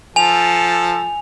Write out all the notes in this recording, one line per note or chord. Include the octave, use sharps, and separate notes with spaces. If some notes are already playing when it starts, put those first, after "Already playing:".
F3 A4 G#5 F7